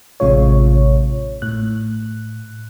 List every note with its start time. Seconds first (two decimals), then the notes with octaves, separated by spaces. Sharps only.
0.20 A1 C3 G#3 F4 C#5
1.42 A2 F#6